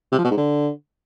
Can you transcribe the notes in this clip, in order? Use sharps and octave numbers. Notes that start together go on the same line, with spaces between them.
C3
F3
B2
G#2
D3